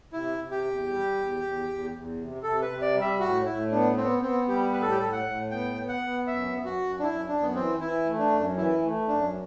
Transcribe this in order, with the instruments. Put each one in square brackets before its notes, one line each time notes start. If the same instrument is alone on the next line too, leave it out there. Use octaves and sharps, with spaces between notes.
[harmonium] C3 [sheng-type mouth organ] E4
[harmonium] C3
[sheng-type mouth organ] G4
[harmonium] E2
G3
E2
E2
E2
E2
C3
[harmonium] C3 [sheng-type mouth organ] A4
[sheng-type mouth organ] B4
[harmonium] C3
[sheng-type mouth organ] D5
[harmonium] G3
[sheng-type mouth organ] E5
[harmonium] A2 [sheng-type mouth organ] F#4
[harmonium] A2 [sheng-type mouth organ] E4
[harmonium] B3 [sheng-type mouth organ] D4
[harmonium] B3 [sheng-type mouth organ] C4
[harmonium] B3 [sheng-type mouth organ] C4
[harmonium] G3 [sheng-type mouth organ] G4
[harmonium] A2 [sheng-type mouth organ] B4
[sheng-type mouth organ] A4
G4
[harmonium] A2 [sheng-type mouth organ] A4
[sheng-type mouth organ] F#5
[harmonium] A2
[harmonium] B3 [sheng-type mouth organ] G5
[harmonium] B3
[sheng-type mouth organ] F#5
[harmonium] B3
[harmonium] F#2 [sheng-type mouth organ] E5
[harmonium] F#2
[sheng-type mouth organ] F#4
[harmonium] F#2
[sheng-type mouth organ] D4
[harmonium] F#2 [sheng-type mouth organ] E4
[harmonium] F#2 [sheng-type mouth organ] D4
[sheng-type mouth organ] B3
[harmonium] E3 [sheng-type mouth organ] C4
[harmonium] E3 [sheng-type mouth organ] E4
[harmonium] A3
[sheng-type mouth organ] D4
[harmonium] F#2
[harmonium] E3 [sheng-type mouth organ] E4
[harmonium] A3
[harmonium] F#2 [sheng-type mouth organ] D4